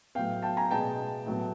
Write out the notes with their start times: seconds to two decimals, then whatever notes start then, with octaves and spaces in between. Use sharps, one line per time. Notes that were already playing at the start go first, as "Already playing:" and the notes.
0.15 A2 F#3 B3 F5 G5
0.43 G5 A5
0.57 G#5 A#5
0.71 B2 G#3 B3 G5 A5
1.26 A2 F#3 B3